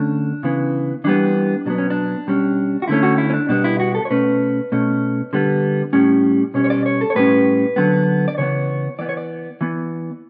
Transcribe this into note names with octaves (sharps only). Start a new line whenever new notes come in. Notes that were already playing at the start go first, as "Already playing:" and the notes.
Already playing: D3 A3 C#4 D4
C#3 E3 B3
E3 G3 B3 D4
B2 F#3 B3 D4
C#4
D4
B2 G3 C#4
F#4
D3 A3 C#4 E4
F#4
E4
C#4
D4
B2 G3 B3 D4
E4
F#4
A4
C#5
B2 A3 C#4 B4
B2 A3 C#4
D3 G3 B3
A2 G3 C#4
B2 G3 C#4 C#5
C#5
D5
C#5
A4
C#5
A2 G3 C#4 B4
D3 F#3 B3
D5
C#3 E3 B3 C#5
E3 B3 D5
C#5
D5
E3 B3